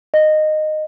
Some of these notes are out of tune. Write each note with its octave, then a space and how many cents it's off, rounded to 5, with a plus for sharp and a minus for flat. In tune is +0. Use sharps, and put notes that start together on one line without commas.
D#5 -15